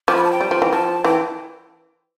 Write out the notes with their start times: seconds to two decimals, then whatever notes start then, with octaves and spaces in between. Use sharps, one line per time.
0.08 F3 D6
0.16 B5
0.24 A5
0.32 G5
0.41 G3
0.51 F3
0.62 E3
0.72 F3 A5
1.04 E3 G5